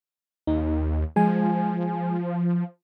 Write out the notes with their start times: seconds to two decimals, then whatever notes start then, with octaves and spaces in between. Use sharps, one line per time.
0.47 D#2 D#4
1.16 F3 G#3 G#5